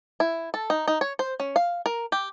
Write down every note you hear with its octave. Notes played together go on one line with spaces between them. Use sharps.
E4
A4
D#4
D#4
C#5
C5
C#4
F5
A#4
G4